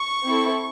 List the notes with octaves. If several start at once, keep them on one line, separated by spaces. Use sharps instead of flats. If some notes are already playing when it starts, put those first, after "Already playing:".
Already playing: C#6
C4 E4 A4